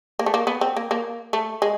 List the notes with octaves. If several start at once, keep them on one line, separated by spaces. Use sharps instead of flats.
A#3
A3
A#3
B3
C4
A#3
A#3
A3
G#3